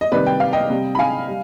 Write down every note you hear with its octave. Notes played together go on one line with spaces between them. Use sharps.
D#5
C3 D#3 G3 B4 D5
G5
F5
D#5 G5
C3 G3
B5
F5 G#5
G3